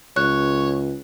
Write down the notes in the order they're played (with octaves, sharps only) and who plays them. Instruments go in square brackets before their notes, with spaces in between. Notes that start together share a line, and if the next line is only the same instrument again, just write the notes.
[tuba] C#2 [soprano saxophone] C#5 [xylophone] F#6